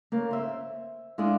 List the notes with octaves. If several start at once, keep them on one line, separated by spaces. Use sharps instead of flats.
C#3 A#3
C5 E5
G#3 D4 E4 F4 G#4